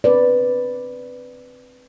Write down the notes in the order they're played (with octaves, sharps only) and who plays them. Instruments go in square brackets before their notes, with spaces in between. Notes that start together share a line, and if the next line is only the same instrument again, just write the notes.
[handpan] C4 B4 D5